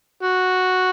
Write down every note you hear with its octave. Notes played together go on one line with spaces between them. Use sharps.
F#4